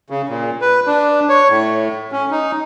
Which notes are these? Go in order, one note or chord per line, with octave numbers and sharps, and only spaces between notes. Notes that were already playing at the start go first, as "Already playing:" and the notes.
C#3
A#2
B4
D4
C#5
A2
C#4
D#4